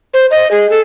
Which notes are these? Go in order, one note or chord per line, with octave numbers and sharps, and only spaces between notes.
C5
D#5
G#4
A4